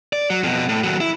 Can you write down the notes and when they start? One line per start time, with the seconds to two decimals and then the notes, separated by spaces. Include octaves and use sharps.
0.13 D5
0.30 F#3
0.43 F2 B2
0.69 A2
0.84 D#2 F#3
1.00 E4